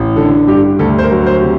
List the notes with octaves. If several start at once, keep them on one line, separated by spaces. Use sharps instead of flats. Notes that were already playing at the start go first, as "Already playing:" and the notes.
Already playing: A1
D3 A4
G2 G4
D2 A4
C5
A#4
F#3
C5
C3